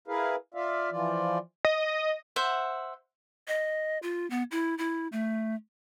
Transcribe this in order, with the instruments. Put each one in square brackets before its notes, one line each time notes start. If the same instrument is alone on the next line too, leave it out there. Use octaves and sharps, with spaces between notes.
[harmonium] E4 G#4 A#4 B4 F5
F4 D5 E5 F5
E3 F3 F4 D5
[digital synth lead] D#5
[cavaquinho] C5 E5 F#5
[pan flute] D#5
F4
B3
E4
E4
A3